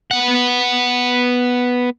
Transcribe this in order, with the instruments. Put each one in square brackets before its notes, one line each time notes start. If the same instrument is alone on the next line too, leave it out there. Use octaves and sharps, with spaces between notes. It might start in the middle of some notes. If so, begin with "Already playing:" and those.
[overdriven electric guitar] B3 F#5